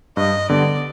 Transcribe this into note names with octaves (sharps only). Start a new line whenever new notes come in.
G2 D#5
D3 G3 B3 D5